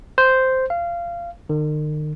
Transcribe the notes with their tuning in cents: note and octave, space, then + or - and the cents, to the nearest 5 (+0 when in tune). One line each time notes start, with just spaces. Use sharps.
C5 -5
F5 -20
D#3 -40